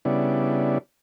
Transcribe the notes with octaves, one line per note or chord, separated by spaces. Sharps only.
C#3 G3 B3 D4 E4